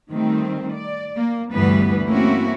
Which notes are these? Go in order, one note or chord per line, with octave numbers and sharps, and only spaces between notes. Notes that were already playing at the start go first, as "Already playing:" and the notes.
D#3 G3 A3 C4
D5
A#3
D2 G2 E3 G3 B3 B4
A3 A#3 C4 C#4 E4 F#4